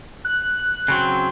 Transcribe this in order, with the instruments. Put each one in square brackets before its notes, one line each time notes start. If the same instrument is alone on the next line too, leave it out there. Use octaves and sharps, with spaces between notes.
[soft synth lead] F#6
[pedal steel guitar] C#3 F#3 C4